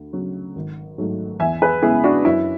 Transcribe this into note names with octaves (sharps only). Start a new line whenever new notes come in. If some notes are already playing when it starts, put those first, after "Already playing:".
Already playing: D2
C#3 F#3
G#1
G#2 F#3 A3
E2 E5 G#5
G#4 B4
C#3 G#3 B3 E4 G#4
D4 F#4
F#2 E4